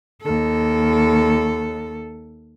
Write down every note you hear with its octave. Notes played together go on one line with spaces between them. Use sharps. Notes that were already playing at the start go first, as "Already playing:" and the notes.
D#2 A4